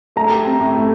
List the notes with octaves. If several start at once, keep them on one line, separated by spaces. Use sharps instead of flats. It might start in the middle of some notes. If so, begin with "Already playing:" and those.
A3 A#5
G4
C4
A2
A3